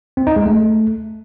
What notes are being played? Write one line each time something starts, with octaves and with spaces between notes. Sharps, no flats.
C4
D#4
G#3
A3